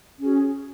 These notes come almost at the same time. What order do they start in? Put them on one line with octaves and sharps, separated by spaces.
C#4 G#4 F#4